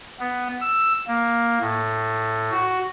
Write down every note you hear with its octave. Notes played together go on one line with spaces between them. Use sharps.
B3
E6
A#3
A2
F#4